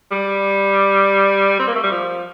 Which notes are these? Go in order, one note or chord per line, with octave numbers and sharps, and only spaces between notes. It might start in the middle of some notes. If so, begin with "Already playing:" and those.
G3
C4
A#3
A3
G3
F3